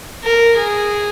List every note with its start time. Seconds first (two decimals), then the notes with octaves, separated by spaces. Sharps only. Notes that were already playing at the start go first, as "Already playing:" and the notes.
0.24 A#4
0.57 G#4